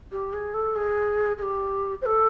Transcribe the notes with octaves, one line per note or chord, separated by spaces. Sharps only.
G4
G#4
A4
G#4
G#4
G4
C5
A4